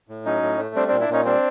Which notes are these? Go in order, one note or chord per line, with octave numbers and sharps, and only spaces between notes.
A2
F#3 C#4 D#4
A2
A3
G3 C4 D4
C4 D4
A#2
D4 E4
A#2 C#4 D#4
G3 C4 D4